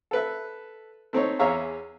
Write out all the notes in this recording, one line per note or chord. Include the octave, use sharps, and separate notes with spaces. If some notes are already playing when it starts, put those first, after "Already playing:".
A4 B4 E5
A3 C4 D#4 C#5
E2 G#4 C#5 E5 F5 A#5